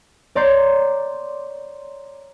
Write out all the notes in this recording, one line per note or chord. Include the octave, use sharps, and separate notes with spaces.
C#5 D5 A#5 C6 G6 C7